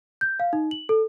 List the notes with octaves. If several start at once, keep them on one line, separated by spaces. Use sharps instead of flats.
G6
F5
D#4
F#7
A4